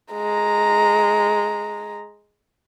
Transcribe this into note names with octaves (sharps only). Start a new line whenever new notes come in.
G#3 A#5